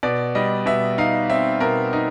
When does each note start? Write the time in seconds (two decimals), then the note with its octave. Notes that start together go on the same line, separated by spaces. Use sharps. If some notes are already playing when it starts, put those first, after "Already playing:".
0.03 B2 D5
0.35 G3 D#5
0.66 B2 E5
0.98 D#4 F5
1.30 C4 E5
1.60 B2 A#4
1.93 D#4